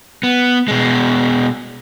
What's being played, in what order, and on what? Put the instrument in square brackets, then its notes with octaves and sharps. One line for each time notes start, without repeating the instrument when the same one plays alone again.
[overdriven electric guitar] B3
B2 G#3